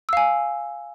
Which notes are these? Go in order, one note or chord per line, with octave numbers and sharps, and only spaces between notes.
F5 G#5 E6